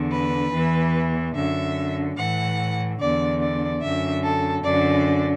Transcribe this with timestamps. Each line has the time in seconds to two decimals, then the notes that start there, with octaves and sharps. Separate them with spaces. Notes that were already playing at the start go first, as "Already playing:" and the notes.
Already playing: E2 D3
0.12 B4
0.53 E2 E3
1.35 F#2 D3 E5
2.17 A2 E3 F#5
2.99 E2 D3 D5
3.40 D5
3.82 F#2 D3 E5
4.23 A4
4.64 F#2 D3 D5